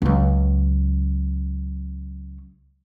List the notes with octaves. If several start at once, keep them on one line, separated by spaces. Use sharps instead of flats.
C#2 F#3